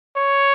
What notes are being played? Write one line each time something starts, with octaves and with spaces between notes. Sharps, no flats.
C#5